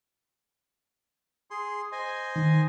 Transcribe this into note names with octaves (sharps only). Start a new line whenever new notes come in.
G#4 C6
C5 D#5 G#5
D#3